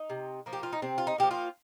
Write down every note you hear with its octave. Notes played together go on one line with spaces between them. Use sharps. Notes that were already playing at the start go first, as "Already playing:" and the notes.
Already playing: D#4
C3
F3 A#3
G4
F4
D#4
C3 C4
F4
D#4
F3 A#3 G4
F4